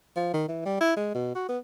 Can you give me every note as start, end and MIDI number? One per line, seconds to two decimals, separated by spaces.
0.16 0.31 53
0.34 0.45 51
0.49 0.63 52
0.66 0.79 55
0.81 0.94 64
0.97 1.10 56
1.15 1.31 47
1.35 1.46 66
1.49 1.58 59